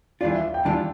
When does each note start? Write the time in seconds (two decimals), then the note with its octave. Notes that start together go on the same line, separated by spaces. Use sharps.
0.21 E3 G3 D4 F4 D5
0.33 E5
0.43 F5
0.54 G5
0.65 E3 G3 D4 F4 A5